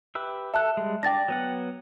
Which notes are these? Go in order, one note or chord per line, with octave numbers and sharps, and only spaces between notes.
G4 B4 E5
A4 E5 A5 F#6
G3 G#3
D4 D5 G5 A6 A#6
F#3 B3 F#5